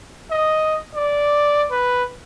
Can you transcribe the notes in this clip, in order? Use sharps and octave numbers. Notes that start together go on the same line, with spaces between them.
D#5
D5
B4